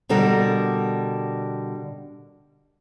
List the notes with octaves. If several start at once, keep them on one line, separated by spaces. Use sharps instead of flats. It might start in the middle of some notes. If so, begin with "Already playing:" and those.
B2 D3 G3 D4 A#4